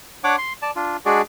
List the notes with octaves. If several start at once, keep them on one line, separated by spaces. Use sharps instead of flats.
D4 C#5 F#5 D6
C6
D5 A5
D4 F4
G#3 D4 F#4 G#4 D5